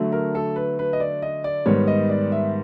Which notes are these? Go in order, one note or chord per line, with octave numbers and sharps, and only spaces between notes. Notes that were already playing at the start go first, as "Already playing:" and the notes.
Already playing: D3 F#3 A3
A#4
A4
B4
B4
D#5
D5
D#5
D5
G#2 D#3 G3 B3 C#5
D#5
D5
E5